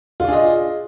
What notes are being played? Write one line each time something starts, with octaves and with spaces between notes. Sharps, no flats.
D4 F4 G#4 D#5